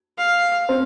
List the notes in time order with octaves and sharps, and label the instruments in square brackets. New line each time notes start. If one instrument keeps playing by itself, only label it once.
[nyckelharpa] F5
[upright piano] C4 C5